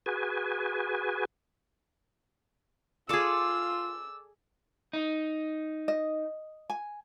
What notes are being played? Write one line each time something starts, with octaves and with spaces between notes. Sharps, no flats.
F#4 G#4 B4 G#5
F4 G#4 A4 D5 D6 E6
D#4
D#5
G#5